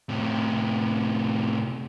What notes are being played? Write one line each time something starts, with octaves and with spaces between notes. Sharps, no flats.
A2 C3